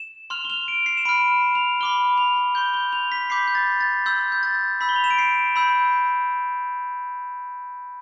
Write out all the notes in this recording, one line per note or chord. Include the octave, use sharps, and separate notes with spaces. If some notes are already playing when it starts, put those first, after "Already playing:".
Already playing: E7
C6 F6 F7
G7
F7
D7
C7
E7
B5 F6 D7
F7
B5 D6 F6 G7
F7
C6 G6 G7
G7
F7
B6
B5 D6 G6 C7
G6
A6
A6
C6 E6 G6
G6
A6
B5 E6 G6 B6
G7
F7
E7
D7
C7
B5 E6 G6